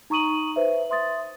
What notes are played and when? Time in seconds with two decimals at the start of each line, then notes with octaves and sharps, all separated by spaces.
0.10 D#4 A#5 C#6 D#6 D#7 F#7
0.56 B4 C5 E5
0.90 E5 C6 D#6 A6